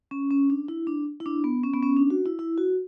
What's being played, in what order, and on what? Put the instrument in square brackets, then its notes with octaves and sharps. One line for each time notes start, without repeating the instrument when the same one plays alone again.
[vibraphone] C#4
C#4
D4
E4
D4
E4
D4
B3
C#4
B3
C#4
D4
F#4
E4
E4
F#4